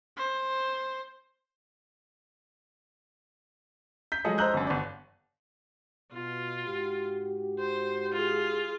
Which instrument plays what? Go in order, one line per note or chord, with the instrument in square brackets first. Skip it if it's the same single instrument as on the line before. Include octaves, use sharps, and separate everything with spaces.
[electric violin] C5
[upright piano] G6 B6
F3 F#3 G#3 G#4 A4 D#5
C5 D#5 A#5 E6 F#6 G6
G1 F#2
G1 D5
[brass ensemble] B2 [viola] F4
[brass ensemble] G#2 F#4 G4
[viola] C5
F4 G#4